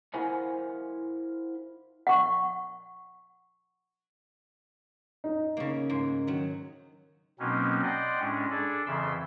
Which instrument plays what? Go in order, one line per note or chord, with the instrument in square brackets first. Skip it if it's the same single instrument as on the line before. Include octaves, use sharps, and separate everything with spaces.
[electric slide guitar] E4 A#4 C5 F5 F#5 G#5
[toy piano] F#5 C#6
[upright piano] D#4
[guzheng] C#3 A#3
G#2 A#3
D#3 F#3
[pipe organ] B2 F#3 A#3 C4 C#4 D#4
D5 D#5 F#5 G5 C6
A2 G#3 C#4 D4
D4 G#4 A4 D5
F2 C#3 E3 E5 C6 E6